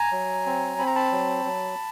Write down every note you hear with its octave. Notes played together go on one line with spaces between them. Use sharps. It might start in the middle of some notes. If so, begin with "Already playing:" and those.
Already playing: G#5 A#5
F#3
C4
C4 B5
A#5
A5 B5
F#3
F#3